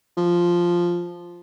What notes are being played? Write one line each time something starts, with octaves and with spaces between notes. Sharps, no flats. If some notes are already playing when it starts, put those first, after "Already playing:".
F3